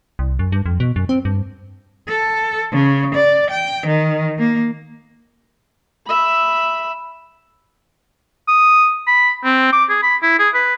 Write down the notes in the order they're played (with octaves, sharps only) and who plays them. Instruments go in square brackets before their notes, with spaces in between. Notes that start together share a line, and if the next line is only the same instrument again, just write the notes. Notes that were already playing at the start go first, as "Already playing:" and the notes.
[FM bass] C2
F#2
G2
F2
B2
F#2
C4
G2
[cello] A4
C#3
D5
G5
D#3
A#3
[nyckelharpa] E5 B5
[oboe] D#6
B5
C4
D6
G#4
B5
E4
G#4
B4